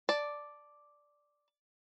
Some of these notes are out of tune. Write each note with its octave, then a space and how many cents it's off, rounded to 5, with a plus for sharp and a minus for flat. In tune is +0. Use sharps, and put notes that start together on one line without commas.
D5 +0 A5 +0